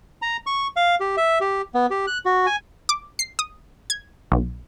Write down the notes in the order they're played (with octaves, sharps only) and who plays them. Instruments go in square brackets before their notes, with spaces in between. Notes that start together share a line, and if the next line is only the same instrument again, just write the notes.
[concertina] A#5
C#6
F5
G4
E5
G4
B3
G4
F#6
F#4
G#5
[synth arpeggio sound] D6
C7
D#6
G#6
B1